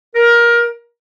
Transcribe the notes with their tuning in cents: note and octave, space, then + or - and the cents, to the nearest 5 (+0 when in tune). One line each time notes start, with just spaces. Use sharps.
A#4 +20